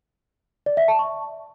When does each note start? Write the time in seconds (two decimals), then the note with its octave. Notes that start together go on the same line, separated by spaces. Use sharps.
0.66 D5
0.77 E5
0.88 A5
0.99 C#6